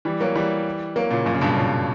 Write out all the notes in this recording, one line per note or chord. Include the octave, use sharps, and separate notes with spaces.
E3 G3
F#3 A#3
E3 G3
F#3 A#3
A#2 C#3
F#2 A#2
C#3
G2 B2
A#2 C#3